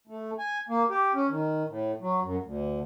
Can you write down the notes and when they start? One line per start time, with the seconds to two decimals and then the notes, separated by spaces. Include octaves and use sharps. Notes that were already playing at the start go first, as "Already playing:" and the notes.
0.07 A3
0.39 G#5
0.69 A#3
0.90 G4
1.14 C#4
1.29 D#3
1.68 A2
2.01 F#3
2.22 F#2
2.43 D2